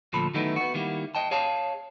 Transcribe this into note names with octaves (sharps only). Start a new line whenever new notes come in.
D2 A#2 F3 A4 B5
D#3 F#3 A3 B3 D#4 E4
B3 F#4
D#3 G3 A#3 E4
D#5 G5 A5
G#4 C#5 F5 A5